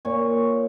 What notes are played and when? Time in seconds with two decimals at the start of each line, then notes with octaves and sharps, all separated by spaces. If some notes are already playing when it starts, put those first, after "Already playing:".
0.05 A#2 C#5